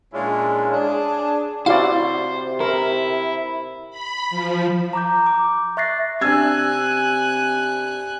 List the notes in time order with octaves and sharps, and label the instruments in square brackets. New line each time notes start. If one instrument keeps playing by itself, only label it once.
[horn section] A#2 G#3 C#4 D4 E4 F4
D4 G#4
[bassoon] C3 [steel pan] E4 F#4 D5 [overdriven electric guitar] C5 [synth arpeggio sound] F5
[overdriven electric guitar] E4 [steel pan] A#4
[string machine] B5
F3
[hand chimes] A#5 D6 G6
D6
E5 C#6 F#6 A6 A#6 C7
[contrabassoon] C3 [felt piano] D4 E6 G#6 [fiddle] G#5 F#6